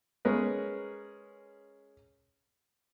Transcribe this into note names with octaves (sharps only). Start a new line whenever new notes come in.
G#3 C#4 G#4 A#4 B4